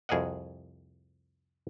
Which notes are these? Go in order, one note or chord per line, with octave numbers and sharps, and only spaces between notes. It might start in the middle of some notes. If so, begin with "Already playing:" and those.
C2 F2 G#4 A#4 D#5 F#5